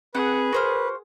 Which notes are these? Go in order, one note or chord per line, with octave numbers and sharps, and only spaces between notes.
C4 G#4 B4 F#5
F#4 A#4 C5 F6